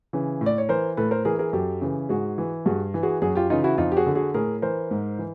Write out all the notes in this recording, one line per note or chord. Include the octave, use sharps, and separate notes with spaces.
C#3 E3
A2
D5
C#5
E3 A#4 C5
A2 A4 B4
A#4 C5
E3 G#4 A#4
G#4 A#4
F#2 G4 A4
C#3 E3
G#2 F#4 G#4
E3
G2 F#4 G#4
E3
F#4 G#4
F#2 F#4 G#4
F4 G4
C#3 E3 D#4 F4
E4 F#4
F2 D#4 F4
G4
F#4 G#4
D3
F#4 G#4
A2 G#4 A#4
E3 A#4 C5
G#2
E3